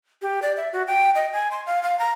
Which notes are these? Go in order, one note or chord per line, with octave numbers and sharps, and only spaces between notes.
G4
D5
E5
F#4
G5
D#5
G#5
C6
F5
F5
A#5